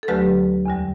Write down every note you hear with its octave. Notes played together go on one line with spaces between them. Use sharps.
A4
D2 D3 F#3 A3 G4 B4
E2 D3 G3